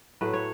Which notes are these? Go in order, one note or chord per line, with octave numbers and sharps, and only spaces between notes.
A2 F#3 A3 B4
C#5